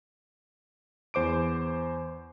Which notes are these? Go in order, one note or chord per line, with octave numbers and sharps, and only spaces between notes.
E2 C5 D6 D7